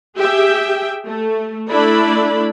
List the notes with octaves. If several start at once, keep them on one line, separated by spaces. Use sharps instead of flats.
G4 G#4 E5 G5
A3
A3 D4 E4 D5 B5